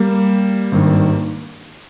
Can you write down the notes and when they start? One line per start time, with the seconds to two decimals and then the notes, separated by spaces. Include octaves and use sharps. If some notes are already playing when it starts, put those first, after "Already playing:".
Already playing: G3 A#3
0.72 G#1 G2 D#3